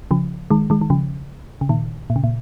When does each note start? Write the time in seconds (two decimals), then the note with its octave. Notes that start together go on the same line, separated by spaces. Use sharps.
0.11 C#3 F3
0.50 D#3 G#3
0.70 D#3 G#3
0.81 D#3
0.90 C#3 F3
1.61 C#3
1.69 A#2 D#3
2.10 A#2
2.16 C#3
2.24 A#2